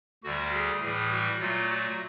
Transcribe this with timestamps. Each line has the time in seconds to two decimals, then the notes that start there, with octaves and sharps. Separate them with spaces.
0.24 D2 D3 G3 F#4
0.53 G#4
0.81 A2 E3 G3 G#4
1.11 F#4
1.40 A#2 F#3 A3 F4
1.70 F#4